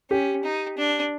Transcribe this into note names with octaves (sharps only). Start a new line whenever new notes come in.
C#4 G4
D#4
D4